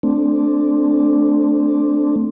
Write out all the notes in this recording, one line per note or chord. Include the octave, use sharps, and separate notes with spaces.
A3 C4 D4